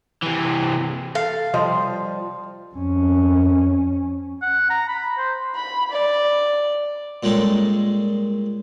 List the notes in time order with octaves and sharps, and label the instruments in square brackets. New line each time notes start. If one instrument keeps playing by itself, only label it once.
[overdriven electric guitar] C3 E3
[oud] A4 [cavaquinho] F5
[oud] F3 G3 D#5
[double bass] F2 C#4
[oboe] F#5
A#5
B5
C5
[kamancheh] B5
D5
[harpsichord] A#2 G3 G#3 C#4 D#4 A4